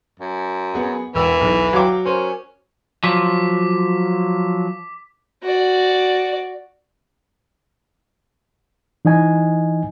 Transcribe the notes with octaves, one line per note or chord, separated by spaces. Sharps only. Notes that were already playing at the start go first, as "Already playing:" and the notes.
F#2
B3 G#4 F#5
E1 E3 E6
B1 E2
F#3 F5 G5 D6
C#4 A#4 C5
F3 F#3 D6 B6
F#4 D5
E3 D#4 D#5 G#5